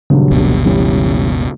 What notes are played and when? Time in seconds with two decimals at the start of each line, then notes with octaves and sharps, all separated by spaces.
0.10 D#1 G2 C#3 F#3
0.31 F#1 C#2 B2
0.65 E3 G3 C#4